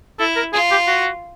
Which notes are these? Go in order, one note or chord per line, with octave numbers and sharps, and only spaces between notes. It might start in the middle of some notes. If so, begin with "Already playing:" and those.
E4 A4
A#4
F4 G#4
G4
F#4